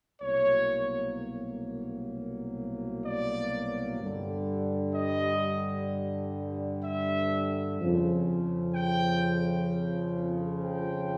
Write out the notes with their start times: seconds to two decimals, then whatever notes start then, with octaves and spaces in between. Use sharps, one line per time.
0.22 C2 B2 F#3 A#3 C#5
3.06 D5
4.01 G2 D3 G3
4.95 D#5
6.84 E5
7.79 F2 C#3 F3
8.74 G5
10.63 G5